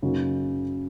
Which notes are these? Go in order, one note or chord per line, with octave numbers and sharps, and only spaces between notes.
F#2 C#3 F#3 A#3 D#4